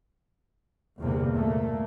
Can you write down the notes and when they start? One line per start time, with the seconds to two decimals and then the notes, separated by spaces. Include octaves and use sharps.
1.00 G1 E2 C3 G3 A#3
1.36 A#2 A3 A#3